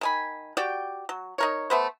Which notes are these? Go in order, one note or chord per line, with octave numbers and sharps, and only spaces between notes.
D#3 G#5 B5
F#4 G4 D5 G5
F#3
D#4 A#4 C#5
A3 B3 C5